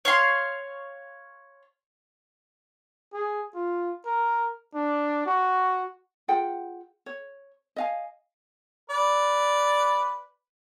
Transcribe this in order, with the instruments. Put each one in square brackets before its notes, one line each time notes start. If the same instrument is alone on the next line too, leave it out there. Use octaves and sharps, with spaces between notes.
[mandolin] C#5 F5 C6
[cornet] G#4
F4
A#4
D4
F#4
[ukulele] F4 G#4 F#5 G5
C#5
D#5 F5 G#5
[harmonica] B4 D5